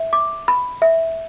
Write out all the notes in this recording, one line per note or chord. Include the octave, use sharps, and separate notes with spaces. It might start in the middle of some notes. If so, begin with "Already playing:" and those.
Already playing: E5
D6
B5
E5